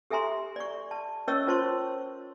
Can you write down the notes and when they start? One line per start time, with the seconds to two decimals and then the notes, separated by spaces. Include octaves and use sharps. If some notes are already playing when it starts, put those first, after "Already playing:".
0.10 G4 A4 E5 G#5 A#5 C6
0.56 D5 C#6
0.91 A5
1.28 C#4 A#4 C#5 D#5 C#6 E6
1.47 C#4 F4 C5 A5 C6 C#6